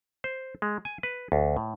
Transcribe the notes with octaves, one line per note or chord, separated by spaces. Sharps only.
C5
G#3
G#5
B4
D2
A2